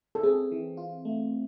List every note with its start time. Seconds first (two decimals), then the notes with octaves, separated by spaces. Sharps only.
0.15 A4
0.23 C4 G#4
0.52 E3
0.77 F4
1.05 A3